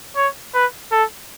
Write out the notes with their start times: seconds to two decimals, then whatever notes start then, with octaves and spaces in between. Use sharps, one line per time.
0.16 C#5
0.54 B4
0.92 A4